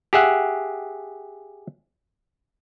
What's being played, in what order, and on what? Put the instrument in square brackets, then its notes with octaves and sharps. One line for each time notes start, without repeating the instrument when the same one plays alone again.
[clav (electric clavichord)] G4 G#4 E5 F#5